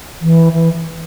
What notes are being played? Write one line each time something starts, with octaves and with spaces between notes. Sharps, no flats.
E3
E3